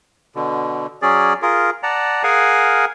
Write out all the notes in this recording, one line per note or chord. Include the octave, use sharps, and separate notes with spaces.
B2 D3
F#3 C#4 G#4 D5
F4 G#4 A#4
D5 F#5 A5 A#5
G#4 A#4 F5 F#5 G#5